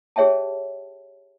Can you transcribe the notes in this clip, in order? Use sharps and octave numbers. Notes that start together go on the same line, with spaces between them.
G4 G#4 C#5 E5 G5 A5